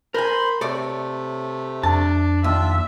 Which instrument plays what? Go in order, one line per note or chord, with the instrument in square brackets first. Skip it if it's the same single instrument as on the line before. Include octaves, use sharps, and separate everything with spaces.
[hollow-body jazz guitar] A#4 G#5 [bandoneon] C5 B5 C6
[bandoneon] C3 A3 [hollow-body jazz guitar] A4 C#5 D5
[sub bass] F2 [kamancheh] D4 [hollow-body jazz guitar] A5
[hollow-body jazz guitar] D#2 [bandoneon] D4 F4 [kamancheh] E5